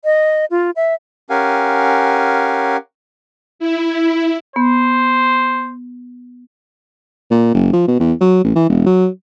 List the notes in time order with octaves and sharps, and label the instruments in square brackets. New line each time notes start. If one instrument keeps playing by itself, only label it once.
[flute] D#5
F4
E5
[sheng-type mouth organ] C#4 G4 A#4 F5 F#5 G#5
[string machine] E4
[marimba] B3 [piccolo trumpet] C5
[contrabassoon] A#2
F#1
F3
B2
E2
F#3
A1
E3
E1
F#3